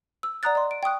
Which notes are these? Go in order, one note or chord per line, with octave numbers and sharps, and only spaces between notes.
E6
D5 F#5 A#5 D#6 F#6 A6
D5 D#5 C6
D7
G5 C#6 D#6 F#6